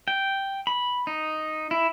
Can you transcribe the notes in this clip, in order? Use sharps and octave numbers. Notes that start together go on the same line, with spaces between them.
G5
B5
D#4
E4